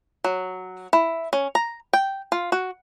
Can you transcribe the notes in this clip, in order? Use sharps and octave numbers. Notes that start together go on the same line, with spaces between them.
F#3
E4
C#4
A#5
G5
F4
F#4